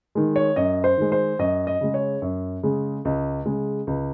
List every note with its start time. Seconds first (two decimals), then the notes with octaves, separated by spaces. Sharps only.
0.15 D#3 G#3
0.36 C#5
0.56 F#2 D#5
0.84 C5
0.97 D#3 G#3
1.12 C5
1.39 F#2 D#5
1.67 D#5
1.81 C#3 G#3
1.94 C#5
2.22 F#2
2.63 C#3 G#3
3.05 C#2
3.45 C#3 G#3
3.87 C#2